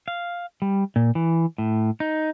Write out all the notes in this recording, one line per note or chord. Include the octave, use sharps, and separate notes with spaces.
F5
G3
A#2
E3
A2
D#4